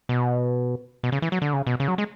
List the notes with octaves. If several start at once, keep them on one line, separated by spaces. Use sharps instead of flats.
B2
B2
C#3
E3
F#3
D3
C#3
B2
C#3
F#3
G#3